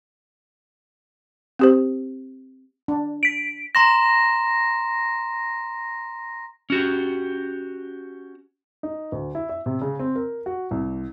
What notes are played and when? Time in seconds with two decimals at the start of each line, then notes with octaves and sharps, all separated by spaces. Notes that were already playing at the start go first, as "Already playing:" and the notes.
1.59 C4 G4 C5
2.88 D4
3.23 B6 D7
3.75 A#5 C6 A#6 E7
6.70 C#4 F#4 G4
8.83 D#4
9.12 D2
9.35 E4
9.49 E5
9.66 C3
9.81 C#3
9.99 C4
10.16 A#4
10.46 F#4
10.71 C2